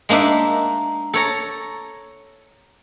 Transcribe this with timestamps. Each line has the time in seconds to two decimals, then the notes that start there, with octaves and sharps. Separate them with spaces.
0.09 G#3 A#3 D4 D#4 E5
1.13 A4 C#5 A#5